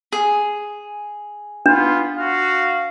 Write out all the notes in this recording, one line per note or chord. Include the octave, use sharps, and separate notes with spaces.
G#4
B3 D4 F4
F#4 F5